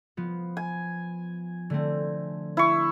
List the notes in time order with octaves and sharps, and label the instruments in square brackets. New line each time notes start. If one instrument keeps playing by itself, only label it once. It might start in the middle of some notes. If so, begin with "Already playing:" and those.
[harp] F3 B3
[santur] G#5
[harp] D3 A3 C4
[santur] E4 C#6